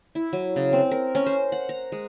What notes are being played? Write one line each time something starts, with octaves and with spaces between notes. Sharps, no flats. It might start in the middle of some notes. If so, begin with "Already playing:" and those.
E4
F#3
C#3
C4
A#4
C#4
C5
F#5
A#5
G#3